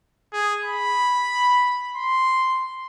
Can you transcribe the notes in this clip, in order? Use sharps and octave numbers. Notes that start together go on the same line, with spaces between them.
G#4
B5
C6